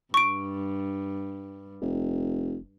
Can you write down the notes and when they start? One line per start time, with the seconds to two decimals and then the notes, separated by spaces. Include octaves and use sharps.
0.14 G2 C#6 D7
1.81 F1